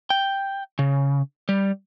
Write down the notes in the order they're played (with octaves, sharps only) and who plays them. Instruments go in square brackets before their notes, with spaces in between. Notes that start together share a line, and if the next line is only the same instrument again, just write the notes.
[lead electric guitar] G5
C#3
G3